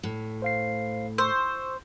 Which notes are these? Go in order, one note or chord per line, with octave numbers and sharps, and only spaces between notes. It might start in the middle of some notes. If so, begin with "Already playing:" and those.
A2
C5 F5 C7
C5 C#6 E6